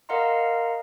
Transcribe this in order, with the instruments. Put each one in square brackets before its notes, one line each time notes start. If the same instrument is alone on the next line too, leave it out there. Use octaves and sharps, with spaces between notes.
[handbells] A#4 D#5 F5 F#5 A#5 C6